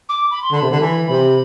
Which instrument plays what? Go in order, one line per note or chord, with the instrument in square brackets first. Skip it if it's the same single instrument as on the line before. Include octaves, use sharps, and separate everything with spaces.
[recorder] D6
B5
C6
[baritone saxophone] D3 [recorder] B5
[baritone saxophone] C3
D3
E3
C3